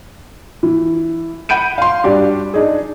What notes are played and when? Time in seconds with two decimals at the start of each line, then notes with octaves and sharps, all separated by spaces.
0.63 E3
1.49 F#5 B5 G6 D7 D#7
1.78 F5 C6
2.04 G2 D4 F#4 G4
2.54 D4 D#4 G#4